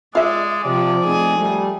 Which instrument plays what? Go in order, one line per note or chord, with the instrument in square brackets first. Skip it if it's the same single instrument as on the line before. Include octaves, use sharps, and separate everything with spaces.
[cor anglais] G#3 [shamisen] F4 E5 [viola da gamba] D5
[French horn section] C3 [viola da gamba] F3 [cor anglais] D5
[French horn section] A3 C4 D#4 [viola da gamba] G#4
[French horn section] G3 A3